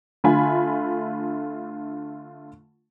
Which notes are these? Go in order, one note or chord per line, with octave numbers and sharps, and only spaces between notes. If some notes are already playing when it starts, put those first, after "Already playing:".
D3 A3 F4 G#5 B5